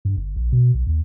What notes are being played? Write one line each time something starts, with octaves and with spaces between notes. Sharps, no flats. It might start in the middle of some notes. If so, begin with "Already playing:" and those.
G2
G1
A#1
B2
B1
D#2